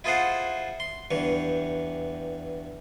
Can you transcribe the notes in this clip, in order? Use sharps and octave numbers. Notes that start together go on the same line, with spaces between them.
E4 F4 G#4 A4 C5 F#5
C6
E2 G2 E3 C#6